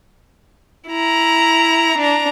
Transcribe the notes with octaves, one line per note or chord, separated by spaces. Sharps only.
E4 A#5
D4 A#5